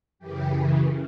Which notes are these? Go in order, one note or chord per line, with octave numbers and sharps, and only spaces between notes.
F#2 C#3 E3 G4